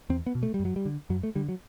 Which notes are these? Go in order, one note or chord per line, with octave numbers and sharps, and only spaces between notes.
E2 C4
B3
B2
A3
G3
F#2
F#3
G3
D3
F#2 F#3
A3
D3 G3
F#3